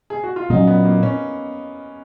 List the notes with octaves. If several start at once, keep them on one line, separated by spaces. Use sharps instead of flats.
G#4
F#4
F4
A#2 F#3 C#4 D#4
B3
A#3
C#4